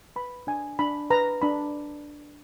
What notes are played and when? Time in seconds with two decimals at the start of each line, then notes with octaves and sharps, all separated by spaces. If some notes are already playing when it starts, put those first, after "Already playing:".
0.16 B4 B5
0.47 D4 G#5
0.79 D4 B5
1.10 B4 A#5
1.42 D4 B5